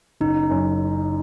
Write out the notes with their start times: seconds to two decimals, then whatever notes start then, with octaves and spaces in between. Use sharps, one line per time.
0.21 F#1 D#4
0.50 F#2